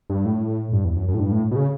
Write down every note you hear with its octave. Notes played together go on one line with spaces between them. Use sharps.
G2
A2
G2
E2
F#2
F#2
A2
G2
A2
B2
C#3